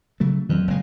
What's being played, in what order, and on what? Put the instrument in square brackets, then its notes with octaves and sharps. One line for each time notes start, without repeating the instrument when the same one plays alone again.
[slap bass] C#3 F#3 A3
[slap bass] F2 [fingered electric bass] D#3 F#3 C4
[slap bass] F#1 G#3